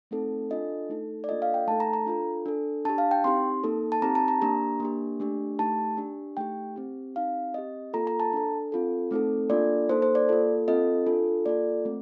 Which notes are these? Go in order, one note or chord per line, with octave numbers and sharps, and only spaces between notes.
A3 C4 D#4 A4
D4 F4 A4 D#5
A3 D#4 A4
D5
A#3 D4 F4 A4 D#5
F5
G5
A3 D#4 A4 A5
A#5
A#5
D4 F4 A4
D4 A4
D4 G4 A5
F5
G5
C4 D#4 G4 C6
A#3 D#4 A4
A5
C4 D#4 G4 A#5
A5
A#5
A#3 D4 G4 A#5
A#3 D4 G4
A3 D4 G4
A3 D#4 G4 A5
D4 G4
A3 D#4 G4 G5
C4 G4
C4 D#4 G4 F5
C4 G4 D#5
A#3 F4 A4 A#5
A#5
A5
D4 A4
C4 F4 A4
A3 C4 D#4 A4
A#3 D4 F4 A4 D5
A#3 D#4 A4 C5
C5
D5
A#3 F4 A4
C4 F4 A4 D#5
D4 F4 A4
A#3 F4 A4 D5
A3 C4